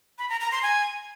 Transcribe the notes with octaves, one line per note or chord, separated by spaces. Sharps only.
B5
A#5
A#5
C6
G#5